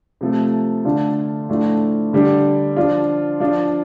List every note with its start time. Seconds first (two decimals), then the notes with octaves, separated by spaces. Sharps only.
0.21 C3 F3 A3
0.85 D3 A3 D4 F4
1.49 A2 F3 A3 D4 F4
2.13 D3 G3 D4
2.76 F3 D4 F4
3.40 F3 D4 F4